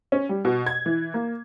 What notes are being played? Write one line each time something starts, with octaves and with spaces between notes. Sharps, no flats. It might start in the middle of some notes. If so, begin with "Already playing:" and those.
C#4
G3
B2
G#6
E3
A#3